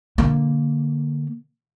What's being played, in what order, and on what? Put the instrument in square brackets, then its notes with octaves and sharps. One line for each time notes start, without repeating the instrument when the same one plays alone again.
[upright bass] D3 A#3